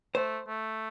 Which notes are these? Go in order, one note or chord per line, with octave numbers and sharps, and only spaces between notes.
A3 C5
A3